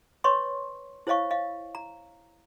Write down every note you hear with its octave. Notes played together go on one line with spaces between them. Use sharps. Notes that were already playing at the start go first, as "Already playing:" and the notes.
B4 C#5 D#5 C6 C#6
E4 C5 C#5 D#5 F5 C#6
D#5 F5
A#5